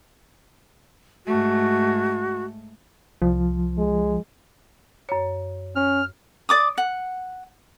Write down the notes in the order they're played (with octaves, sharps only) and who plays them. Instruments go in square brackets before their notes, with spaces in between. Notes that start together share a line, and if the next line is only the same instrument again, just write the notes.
[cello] G#2 A3 [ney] F#4
[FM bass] C2 [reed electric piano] F3
[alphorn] G#3
[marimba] F#2 C#5
[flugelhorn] C#4 [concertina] F6
[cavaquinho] D5 D6 D#6
F#5